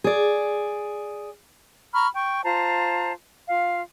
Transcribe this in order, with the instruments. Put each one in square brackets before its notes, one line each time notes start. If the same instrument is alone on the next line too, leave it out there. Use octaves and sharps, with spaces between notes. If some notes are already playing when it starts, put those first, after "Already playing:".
[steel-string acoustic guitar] G#4 D5
[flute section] A#5 B5 C#6 F6
G5 C#6
F4 C5 A5 A#5
F4 F5